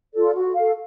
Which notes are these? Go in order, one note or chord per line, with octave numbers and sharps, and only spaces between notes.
F4 A4 D5
F#4
A4 F5